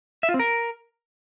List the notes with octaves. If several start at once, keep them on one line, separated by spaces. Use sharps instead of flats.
E5
F4
C4
A#4